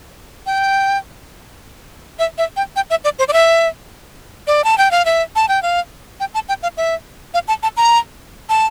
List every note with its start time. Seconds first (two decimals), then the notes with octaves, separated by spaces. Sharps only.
0.46 G5
2.19 E5
2.38 E5
2.56 G5
2.76 G5
2.90 E5
3.04 D5
3.19 C5
3.28 D5
3.33 E5
4.47 D5
4.64 A5
4.78 G5
4.91 F5
5.05 E5
5.36 A5
5.49 G5
5.63 F5
6.20 G5
6.34 A5
6.49 G5
6.63 F5
6.77 E5
7.34 F5
7.48 A5
7.63 A5
7.77 A#5
8.49 A5